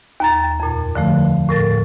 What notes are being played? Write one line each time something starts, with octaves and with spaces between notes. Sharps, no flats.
D#2 A#5 A6
F2 A#2
D3 F3 A3
A2 A#4 A6